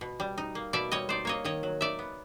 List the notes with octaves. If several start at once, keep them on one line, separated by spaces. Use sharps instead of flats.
B2
G3
D#4
A#3
B2 D5 E5
G3 C#5 D#5
D#4 C5 D5
A#3 C#5 D#5
D#3 C#5 D#5
F#3
D#4 D5 E5
B3